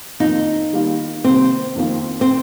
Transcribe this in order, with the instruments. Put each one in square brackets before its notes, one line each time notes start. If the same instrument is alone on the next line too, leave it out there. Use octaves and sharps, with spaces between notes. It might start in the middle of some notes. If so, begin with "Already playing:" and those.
[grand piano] F2 D#3 A#3 F4 [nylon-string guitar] D#4
[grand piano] D#3 G3 A#3 F4
[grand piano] C3 D#3 G3 A#3 [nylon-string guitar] C4
[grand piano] F2 D#3 A#3 F4
[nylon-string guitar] C4